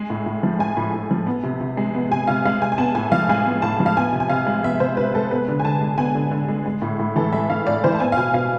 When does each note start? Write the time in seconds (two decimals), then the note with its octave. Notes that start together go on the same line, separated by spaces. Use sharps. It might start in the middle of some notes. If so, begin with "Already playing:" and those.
Already playing: G#3 G#5
0.10 A2
0.26 A2
0.43 F3
0.59 G#3 G#5
0.77 A2
0.93 A2
1.11 F3
1.27 B3
1.43 C3
1.61 C3
1.77 G#3
1.94 B3
2.11 C3 G#5
2.27 C3 F5
2.45 G#3 F5
2.62 G#3 G#5
2.72 G#5
2.78 B3 A5
2.95 A2 G#5
3.12 F3 F5
3.29 G#3 G#5
3.46 B3
3.62 A2 A5
3.80 F3
3.86 F5
3.97 B3 G#5
4.13 C3
4.20 G#5
4.30 C3 F5
4.47 G#3
4.64 B3 E5
4.80 C3 C5
4.97 C3 B4
5.14 G#3 A4
5.31 B3 B4
5.48 D3
5.60 G#5
5.65 D3 A5
5.81 G#3
5.98 B3 G#5
6.15 D3
6.31 D3
6.48 G#3
6.66 G#3
6.82 A2
6.99 A2
7.16 E3 A4
7.32 G#3 E5
7.50 A2 F5
7.67 A2 D5
7.84 E3 C5
7.94 A5
8.00 B3 G#5
8.12 F5
8.17 B2 G#5
8.33 B2 F5